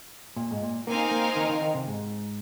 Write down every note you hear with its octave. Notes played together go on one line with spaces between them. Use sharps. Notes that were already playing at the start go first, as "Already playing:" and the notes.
A#2
G#2
A#2
A#3 C4 D#4 A#4 F5 G#5
A#3
D#3
D#3
D#3
C3
G#2